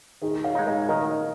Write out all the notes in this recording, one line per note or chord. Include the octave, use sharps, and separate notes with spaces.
D#3 D#4 G#4
C#5 F5
G#3 D#4
A#4 D#5
D#3 A#4 D#5